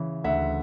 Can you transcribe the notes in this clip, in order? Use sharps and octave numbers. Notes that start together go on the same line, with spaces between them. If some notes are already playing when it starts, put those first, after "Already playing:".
Already playing: C#3 E3
D2 E5 F#5